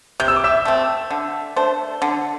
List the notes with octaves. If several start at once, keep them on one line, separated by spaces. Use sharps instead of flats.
C3 G6
E6
D6
E5 E6
A3 C4
D3
A3 D4 C5
D3